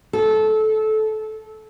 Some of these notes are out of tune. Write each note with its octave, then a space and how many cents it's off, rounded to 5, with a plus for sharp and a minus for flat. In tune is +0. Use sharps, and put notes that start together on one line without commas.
A4 -20